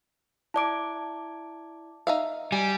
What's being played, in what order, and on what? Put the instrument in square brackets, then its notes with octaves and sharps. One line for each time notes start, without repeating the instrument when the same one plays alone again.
[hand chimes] E4 D5 D6 [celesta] A5 D7
[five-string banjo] D#4 E5 F5
[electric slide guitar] G3 [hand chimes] G#5